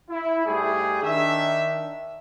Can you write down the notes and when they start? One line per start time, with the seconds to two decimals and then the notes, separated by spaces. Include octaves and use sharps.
0.10 E4
0.46 G#2 G3 A3 G#4
1.02 D#3 D4 E5